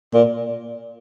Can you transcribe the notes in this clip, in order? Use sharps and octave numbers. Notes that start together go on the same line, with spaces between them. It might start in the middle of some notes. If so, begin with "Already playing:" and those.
A#2